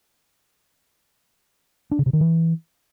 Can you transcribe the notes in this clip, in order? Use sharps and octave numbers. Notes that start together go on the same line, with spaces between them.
D4
C#3
C3
D#3
E3